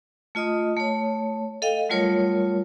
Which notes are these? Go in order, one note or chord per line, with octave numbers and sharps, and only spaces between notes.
A3 F4 D#5 D#6
A3 C#5
A4 D#5 F5 G5
F#3 G3 A3 F4 A#4 C#5